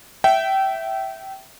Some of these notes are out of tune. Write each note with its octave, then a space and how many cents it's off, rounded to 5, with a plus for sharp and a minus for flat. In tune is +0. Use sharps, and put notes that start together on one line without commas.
E5 +0 G5 -25